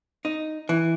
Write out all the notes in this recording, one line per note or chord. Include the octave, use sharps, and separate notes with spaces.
D#4
E3